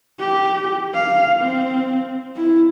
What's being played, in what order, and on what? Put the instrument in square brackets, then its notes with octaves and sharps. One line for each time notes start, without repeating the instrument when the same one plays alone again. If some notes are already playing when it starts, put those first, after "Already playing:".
[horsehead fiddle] G4
F5
C4
E4